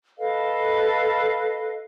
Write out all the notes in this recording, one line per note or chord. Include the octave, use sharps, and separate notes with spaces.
A4 B4 D#5 F5